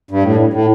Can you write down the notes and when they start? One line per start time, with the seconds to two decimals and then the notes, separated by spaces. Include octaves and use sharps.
0.11 G2
0.23 A2
0.36 G2
0.53 A2